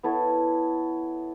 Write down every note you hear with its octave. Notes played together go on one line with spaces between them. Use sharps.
B3 E4 A4 C#5